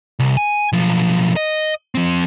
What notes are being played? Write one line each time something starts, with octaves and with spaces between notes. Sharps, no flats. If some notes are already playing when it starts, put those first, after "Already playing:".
C2
G#5
B1 F3
D#5
F3 C4